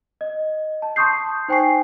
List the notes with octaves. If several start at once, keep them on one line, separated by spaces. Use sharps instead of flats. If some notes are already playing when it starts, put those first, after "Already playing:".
D#5
A5
A5 C6 C#6 D#6 G6 C7
D#4 C5 G5 G#5 C#6 C7